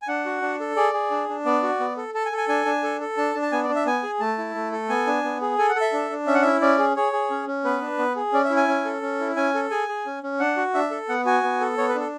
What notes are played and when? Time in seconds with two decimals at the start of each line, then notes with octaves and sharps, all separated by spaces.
0.02 G#5
0.08 D4 F#5
0.25 F#4
0.42 D4
0.60 A4
0.76 G#4 D5
0.93 G#4
1.11 D4
1.28 D4
1.45 B3 D5
1.63 F#4
1.80 B3
1.97 A4
2.14 A4 A5
2.25 G#5
2.32 A4
2.37 G#5
2.48 D4 G#5
2.66 D4
2.83 A4
3.01 A4
3.17 D4 A5
3.35 D4
3.42 A5
3.52 B3 G#5
3.64 D5
3.69 D4
3.75 E5
3.86 B3 G#5
4.03 G#4
4.20 A3 A5
4.38 E4
4.55 A3
4.72 A4
4.89 B3 G#5
5.07 D4
5.24 B3
5.41 G#4
5.58 A4 G#5
5.69 F#5
5.76 A4
5.81 E5
5.93 D4
6.10 D4
6.27 C#4 E5
6.35 F#5
6.42 E4 E5
6.61 C#4 D5
6.78 G#4
6.96 G#4 C#5
7.13 G#4
7.30 C#4
7.47 C#4
7.64 B3 B4
7.81 D4
7.98 B3
8.16 G#4
8.33 C#4 D5
8.45 E5
8.50 E4
8.56 G#5
8.68 C#4
8.85 A4
9.02 C#4
9.20 E4
9.36 C#4 G#5
9.54 A4
9.70 G#4 G#5
9.88 G#4
10.06 C#4
10.23 C#4
10.40 D4 F#5
10.57 F#4
10.74 D4 E5
10.91 A4
11.09 B3 F#5
11.25 F#4 G#5
11.43 B3
11.61 A4
11.78 B3 C#5
11.89 B4
11.95 D4 A4